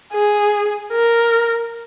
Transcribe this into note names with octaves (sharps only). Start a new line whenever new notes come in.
G#4
A#4